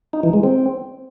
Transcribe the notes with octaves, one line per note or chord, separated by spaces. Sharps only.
D#4
E3
G#3
C4